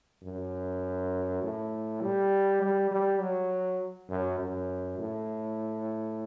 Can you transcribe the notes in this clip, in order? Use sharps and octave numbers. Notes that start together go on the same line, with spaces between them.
F#2
A2
G3
G3
G3
F#3
F#2
F#2
A2